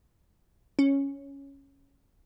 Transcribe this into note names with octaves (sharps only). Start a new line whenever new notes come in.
C#4